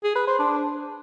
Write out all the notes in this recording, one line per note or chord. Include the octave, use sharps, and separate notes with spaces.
G#4
B4
C5
D4